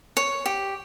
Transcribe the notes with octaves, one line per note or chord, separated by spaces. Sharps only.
C#5
G4